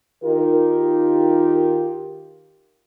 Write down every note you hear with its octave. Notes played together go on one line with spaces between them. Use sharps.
D#3 D#4 F4 G4 A#4